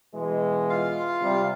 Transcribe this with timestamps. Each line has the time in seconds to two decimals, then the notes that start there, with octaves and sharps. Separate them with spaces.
0.13 B2 E3 G#3
0.70 F4 F5
1.21 C3 G3